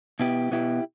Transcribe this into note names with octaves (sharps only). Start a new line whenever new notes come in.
B2 B3 E4 G4
B2 B3 E4 G4